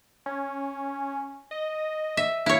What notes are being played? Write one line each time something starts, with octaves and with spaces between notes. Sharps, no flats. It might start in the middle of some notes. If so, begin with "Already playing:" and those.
C#4
D#5
E5
E4 C#5 F5